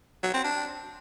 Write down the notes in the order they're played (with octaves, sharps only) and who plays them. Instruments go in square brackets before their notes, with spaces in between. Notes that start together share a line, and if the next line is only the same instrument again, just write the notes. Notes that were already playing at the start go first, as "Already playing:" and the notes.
[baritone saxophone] F#3
C4
D4